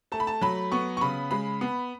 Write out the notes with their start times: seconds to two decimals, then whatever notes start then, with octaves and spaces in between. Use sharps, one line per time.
0.12 A3 A5
0.20 B5
0.27 A5
0.42 F#3 B5
0.72 B3 C#6
0.97 C#6
1.01 C#3 B5
1.31 G#3 B5
1.61 B3